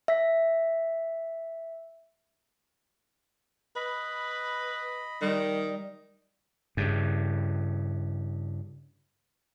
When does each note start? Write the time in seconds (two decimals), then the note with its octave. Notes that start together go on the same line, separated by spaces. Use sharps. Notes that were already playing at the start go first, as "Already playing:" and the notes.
0.08 E5 B6
3.76 B4 D#5 B5
5.22 D#3 G3 D#5
6.77 G2 C#3